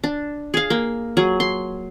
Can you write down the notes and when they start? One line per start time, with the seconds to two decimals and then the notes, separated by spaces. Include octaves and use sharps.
0.04 D4
0.54 G#4 F5
0.70 A#3
1.17 F#3 G#4
1.40 C6